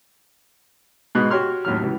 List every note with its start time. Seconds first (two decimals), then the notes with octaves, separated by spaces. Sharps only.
1.15 G#2 B2 B4 D#5 F#6
1.31 F#4 G4 C#5 C6 F6
1.65 A1 D#2 F#3 F6
1.82 C#2 E3